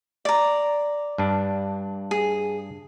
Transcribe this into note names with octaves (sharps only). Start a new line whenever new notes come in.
D5 A#5
G2 D4
G#4